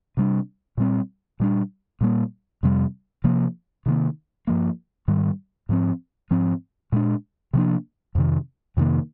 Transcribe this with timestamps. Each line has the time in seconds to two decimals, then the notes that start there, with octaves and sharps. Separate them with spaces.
0.17 C3 G3 D4
0.77 A#2 G3 C4
1.40 A#2 G3 D4
2.01 A#2 G3 A#3
2.63 F2 C3 G3
3.24 C3 F3 A#3
3.86 C3 D#3 A#3
4.47 G2 F3 A#3
5.08 G#2 D#3 G3
5.69 G#2 F3 C4
6.31 G#2 F3 C4
6.92 A#2 G#3 D4
7.53 C3 F3 A#3 D4
8.15 F2 C3 D#3
8.77 F2 C3 D#3 A#3